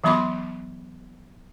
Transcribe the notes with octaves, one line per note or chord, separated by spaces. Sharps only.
E3 F#3 B3 B5 C6 D6